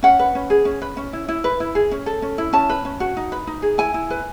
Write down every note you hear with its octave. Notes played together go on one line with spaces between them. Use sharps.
C#4 F#5
B4
C#4
G#4
C#4
B4
C#4
E4
E4
B4
E4
G#4
C#4
A4
C#4
E4
C#4 A5
B4
C#4
F#4
D#4
B4
D#4
G#4
E4 G#5
E4
B4